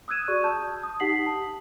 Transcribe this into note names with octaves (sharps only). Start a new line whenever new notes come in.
D#6 E6 F#6 G#6 D#7 E7
F#4 G#4 D5 C#6
A5 G6
D#6
D#4 G4 F#5 B6 C7 F#7
A5